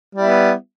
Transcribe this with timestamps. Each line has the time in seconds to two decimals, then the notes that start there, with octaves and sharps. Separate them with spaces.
0.15 G3
0.18 E4
0.22 B3